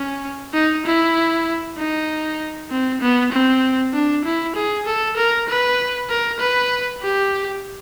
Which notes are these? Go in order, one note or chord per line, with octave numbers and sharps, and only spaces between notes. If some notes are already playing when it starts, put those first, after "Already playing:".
Already playing: C#4
D#4
E4
D#4
C4
B3
C4
D4
E4
G#4
A4
A#4
B4
A#4
B4
G4